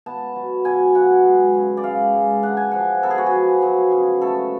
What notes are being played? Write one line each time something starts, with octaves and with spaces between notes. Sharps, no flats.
B3 A5
F#3
B2 G#5
F#3 F#5
G#3
C#3
D5
G#3 F5
G#3
D4 F#5
G#5
F3 F#5
B3 A4
G#4
F#4
G#4
F3
F#3
C#3
A3 A4